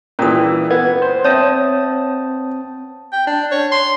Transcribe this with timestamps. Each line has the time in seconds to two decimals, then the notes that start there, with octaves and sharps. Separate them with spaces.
0.19 A#2 E3 C#4 D#6
0.71 B3 G#6
1.02 C5
1.24 C4 C#5 E5 A5 D#6
3.13 G5
3.27 D4
3.52 C#5
3.72 C6